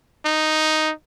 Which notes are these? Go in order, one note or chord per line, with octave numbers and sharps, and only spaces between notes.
D#4